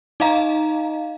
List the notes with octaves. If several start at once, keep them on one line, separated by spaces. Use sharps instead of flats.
D#4 D#5 F5 A#5